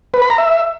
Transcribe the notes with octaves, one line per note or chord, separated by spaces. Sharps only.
B4
B5
A#5
E5